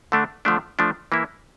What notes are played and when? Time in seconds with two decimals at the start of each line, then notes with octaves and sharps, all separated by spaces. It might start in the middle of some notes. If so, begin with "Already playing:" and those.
0.12 D3 A3 D4
0.45 D3 F3 A3 D4
0.79 F3 A3 D4
1.12 E3 A#3 E4